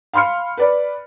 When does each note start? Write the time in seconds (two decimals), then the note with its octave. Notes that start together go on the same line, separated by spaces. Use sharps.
0.13 F5 B5 C6 F6 C#7
0.57 B4 D5 B5